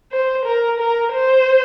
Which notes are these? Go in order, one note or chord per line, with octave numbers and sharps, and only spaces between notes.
C5
A#4
A#4
C5